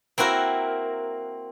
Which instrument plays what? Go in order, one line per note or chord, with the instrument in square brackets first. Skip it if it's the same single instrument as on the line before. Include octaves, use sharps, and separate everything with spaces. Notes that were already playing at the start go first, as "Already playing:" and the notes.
[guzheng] A#3 C4 E4 F#4 A#4